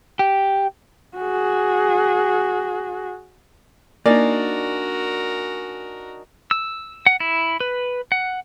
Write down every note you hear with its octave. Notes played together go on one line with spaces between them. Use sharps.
G4
F#4 G#4
A#3 D4 D#4 F#4 A#4 D5 G#5
E6
F#5
E4
B4
F#5